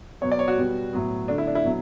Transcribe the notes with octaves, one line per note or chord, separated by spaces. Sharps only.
B2 F#3 B3 C#5
D5
C#5
F#4
B2 G3 B3
A2 F#3 B3
D3 A3 D4
E4
D4
E4
B2 F#3